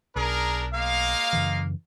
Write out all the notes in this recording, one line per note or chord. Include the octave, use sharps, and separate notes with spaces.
B1 D4 G#4 A#4
G#3 A#3 F5
F#2 C#3 E3